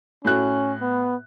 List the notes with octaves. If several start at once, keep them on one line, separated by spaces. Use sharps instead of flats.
A2 C#4 F#4 F#6
B3